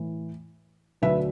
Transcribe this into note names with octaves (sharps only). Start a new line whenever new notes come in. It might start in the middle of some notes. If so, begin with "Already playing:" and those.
Already playing: A2 E3
D2 D3 F#3 B4 E5